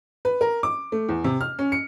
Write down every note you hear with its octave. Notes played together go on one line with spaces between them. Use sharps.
B4
A#4
D6
A3
E2
C3
F6
C#4
C#7